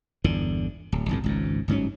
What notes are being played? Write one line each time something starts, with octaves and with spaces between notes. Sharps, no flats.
G1 E2 D3
D1
G1 C2 A2
G#1 C#2 G#2
G1 G#2 F#3 C#4